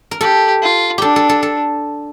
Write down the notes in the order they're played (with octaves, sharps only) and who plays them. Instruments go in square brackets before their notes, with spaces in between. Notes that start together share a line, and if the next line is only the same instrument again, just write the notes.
[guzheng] A#4
[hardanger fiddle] G4 [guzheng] A4
[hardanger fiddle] F4
[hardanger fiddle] D4 [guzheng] G4 A4
[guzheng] A4
A4
A4